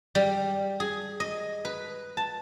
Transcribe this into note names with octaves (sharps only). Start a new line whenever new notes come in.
G3
G#4
D#5
B4
A5